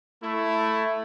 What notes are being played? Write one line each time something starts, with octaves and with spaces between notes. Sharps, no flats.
A3 E4